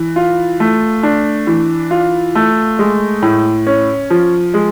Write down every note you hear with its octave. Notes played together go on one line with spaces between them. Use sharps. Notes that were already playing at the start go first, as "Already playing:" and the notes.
Already playing: E3
F4
A3
D4
E3
F4
A3
G#3
A2
C#4
F3
G#3